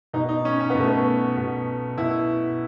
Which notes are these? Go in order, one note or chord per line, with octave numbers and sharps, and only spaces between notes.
B2 D#4
D#4
C#4
C#4
B3
B2 A3
B3
B2
B2 E4